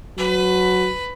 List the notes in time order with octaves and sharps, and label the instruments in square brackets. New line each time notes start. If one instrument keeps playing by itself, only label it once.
[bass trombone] F#3 [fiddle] B4